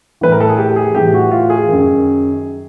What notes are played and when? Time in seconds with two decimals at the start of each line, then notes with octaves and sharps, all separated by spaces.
0.21 A2 E3 B4
0.32 A#4
0.40 A4
0.49 G#4
0.58 G4
0.76 G#4
0.95 A2 E3 G4
1.14 F#4
1.31 F4
1.50 G#4
1.68 F#2 D#3